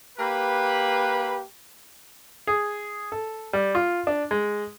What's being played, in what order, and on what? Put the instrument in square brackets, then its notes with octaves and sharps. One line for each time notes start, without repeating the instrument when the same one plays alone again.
[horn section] A#3 G4 B4
[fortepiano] G#4
A4
G3
F4
D4
G#3